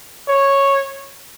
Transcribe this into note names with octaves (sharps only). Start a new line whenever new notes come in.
C#5